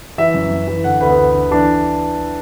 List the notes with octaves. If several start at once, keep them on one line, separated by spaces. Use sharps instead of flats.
E3 E5
F#2
F#2
E3
D3 F#5
D2 B4
B3
D2
D3
E3 D4